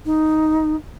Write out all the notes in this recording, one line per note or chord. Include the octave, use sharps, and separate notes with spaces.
D#4